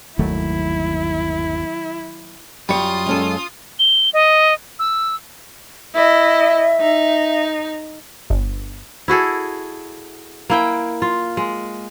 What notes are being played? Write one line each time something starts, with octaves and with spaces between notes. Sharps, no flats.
G1 D#2 D#3 F#3 A3 E4
F#2 G3 F4 C#5 D#6
G#3 C#4 A4
G7
D#5
E6
E4 D#5 E5
D#4
G1
E4 F#4 G#4 A4
A#3 E4 G5
F4
G#3